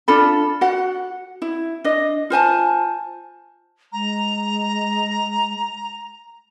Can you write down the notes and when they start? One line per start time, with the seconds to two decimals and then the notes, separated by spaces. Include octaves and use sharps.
0.08 D4 F4 A4 B5
0.61 F#4 F#5
1.42 E4
1.84 D4 D#5
2.30 F4 C5 G#5 A5
3.93 G#3 A#5